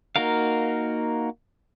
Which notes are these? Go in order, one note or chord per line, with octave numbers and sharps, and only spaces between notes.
A#3 D#4 F#4 A#4 F5